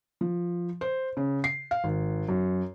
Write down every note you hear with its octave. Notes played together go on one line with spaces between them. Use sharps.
F3
C5
C#3
C7
F5
G#1
F#2